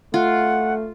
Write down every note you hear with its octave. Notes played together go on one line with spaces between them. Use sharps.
A3 F4 F#5